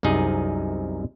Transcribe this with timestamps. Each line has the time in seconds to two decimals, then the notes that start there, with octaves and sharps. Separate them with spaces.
0.03 C2 F#2 C3 D#4 G#4